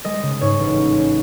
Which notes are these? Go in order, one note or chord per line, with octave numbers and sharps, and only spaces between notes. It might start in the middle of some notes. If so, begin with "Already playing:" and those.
G#3 D#5
C#3
G#2 C#5
A1
C#4
C#4